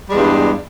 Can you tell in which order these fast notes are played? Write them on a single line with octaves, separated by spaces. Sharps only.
G3 G#3 E2 G2